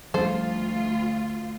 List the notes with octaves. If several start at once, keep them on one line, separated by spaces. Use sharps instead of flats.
D2 F3 G3 C#4 F4 A4 C5